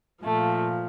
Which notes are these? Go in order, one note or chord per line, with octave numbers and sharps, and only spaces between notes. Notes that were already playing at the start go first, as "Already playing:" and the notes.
A#2 F3 A3